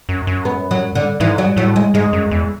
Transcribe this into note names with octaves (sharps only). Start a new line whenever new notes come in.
F#2
F#2
B3
F#3
D3
G#2 E3
F#3
A2 F#3
G#3
G#2 G#3
F#2
E2